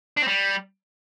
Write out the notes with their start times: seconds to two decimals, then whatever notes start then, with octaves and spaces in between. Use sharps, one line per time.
0.17 D4
0.22 C4
0.27 G3